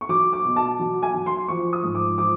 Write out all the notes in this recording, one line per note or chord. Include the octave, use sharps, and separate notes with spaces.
C#6
F#3 D6
D6
B2
A5
F#3
G#5
F#3
C6
F3 C#6
D#6
G#2
D6
F3 D6